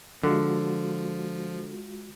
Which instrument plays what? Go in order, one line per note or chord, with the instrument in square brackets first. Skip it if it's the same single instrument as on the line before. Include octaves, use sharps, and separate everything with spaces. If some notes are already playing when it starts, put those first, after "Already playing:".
[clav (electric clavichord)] D3 [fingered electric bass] F3 [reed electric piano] G#3 F4 F#4